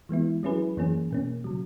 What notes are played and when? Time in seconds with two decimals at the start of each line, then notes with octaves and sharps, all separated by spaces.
0.09 E3 G#3 B3 E4
0.43 F#3 C#4 E4 G#4 B4
0.77 F#2 E3 A#3 C#4 G#4
1.11 B2 A#3 C#4
1.44 C#3 F#3